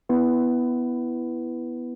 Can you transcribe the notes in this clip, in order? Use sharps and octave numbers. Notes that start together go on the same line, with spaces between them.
B3 E4 B4